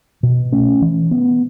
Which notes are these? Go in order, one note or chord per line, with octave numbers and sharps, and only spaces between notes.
B2
A3 C#4
E3
B3